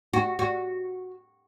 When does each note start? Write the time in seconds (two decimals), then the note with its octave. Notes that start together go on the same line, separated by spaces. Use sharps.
0.13 F#4
0.39 F#4